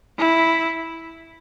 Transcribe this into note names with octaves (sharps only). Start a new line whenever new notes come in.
E4